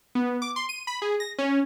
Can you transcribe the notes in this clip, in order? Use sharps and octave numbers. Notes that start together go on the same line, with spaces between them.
B3
D6
C6
D#7
B5
G#4
A#6
C#4